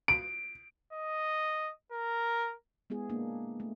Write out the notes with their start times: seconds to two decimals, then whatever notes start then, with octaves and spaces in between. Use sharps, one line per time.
0.08 D7
0.93 D#5
1.92 A#4
2.90 G#3 B3 E4 G#4
3.10 A#3 D4
3.60 A3